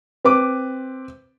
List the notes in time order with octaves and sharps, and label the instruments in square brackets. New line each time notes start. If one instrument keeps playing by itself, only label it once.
[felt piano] C4 B4 D6